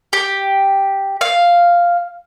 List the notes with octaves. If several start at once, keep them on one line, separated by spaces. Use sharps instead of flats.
G4
F5